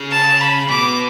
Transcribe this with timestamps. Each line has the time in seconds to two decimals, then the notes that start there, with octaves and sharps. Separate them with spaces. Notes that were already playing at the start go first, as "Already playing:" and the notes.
Already playing: C#3
0.12 A5
0.41 B5
0.70 B2 D6